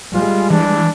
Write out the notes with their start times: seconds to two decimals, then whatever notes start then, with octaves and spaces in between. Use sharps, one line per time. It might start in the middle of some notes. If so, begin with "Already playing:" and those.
0.14 G3 G#3 F4
0.50 E3 D4